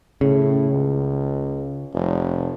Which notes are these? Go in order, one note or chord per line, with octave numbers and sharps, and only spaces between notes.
A2 C#3
C#2
F1